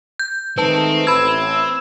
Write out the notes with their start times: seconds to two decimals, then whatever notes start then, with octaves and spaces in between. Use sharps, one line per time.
0.19 G6
0.58 D#3 G#3 A3 C4 B4 A5
1.07 A1 A2 B5 E6 G#6